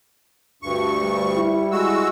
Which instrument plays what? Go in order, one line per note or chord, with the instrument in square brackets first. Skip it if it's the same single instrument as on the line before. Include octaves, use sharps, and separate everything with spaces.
[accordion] D2 G2 C#6
[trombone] G3
[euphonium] E4
[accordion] G#3 F#4 E6